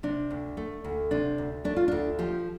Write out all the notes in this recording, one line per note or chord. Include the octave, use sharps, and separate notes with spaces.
C3 D4
D2
A3
D2
C3 D4
D2
A3 D4
F4
D2 D4
F3 G4